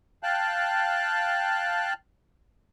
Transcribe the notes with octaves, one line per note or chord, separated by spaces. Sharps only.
F5 G5 A5 F#6